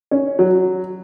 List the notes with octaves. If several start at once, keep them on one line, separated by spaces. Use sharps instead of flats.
C#4
F#3